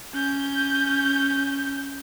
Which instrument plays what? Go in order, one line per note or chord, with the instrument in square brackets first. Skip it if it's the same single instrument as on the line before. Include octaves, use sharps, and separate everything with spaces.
[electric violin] C#4 G6